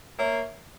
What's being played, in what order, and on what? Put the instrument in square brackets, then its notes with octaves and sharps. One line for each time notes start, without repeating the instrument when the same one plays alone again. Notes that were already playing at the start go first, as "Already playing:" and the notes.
[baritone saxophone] A#3 [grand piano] C#5 E5